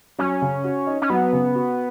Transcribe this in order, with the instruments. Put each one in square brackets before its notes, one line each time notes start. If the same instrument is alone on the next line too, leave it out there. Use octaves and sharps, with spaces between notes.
[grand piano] F#3 [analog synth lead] C#4
[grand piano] C#3
F#4
D#4
[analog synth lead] C#4
[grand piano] F#3 [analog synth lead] B3
[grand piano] C#3
F#4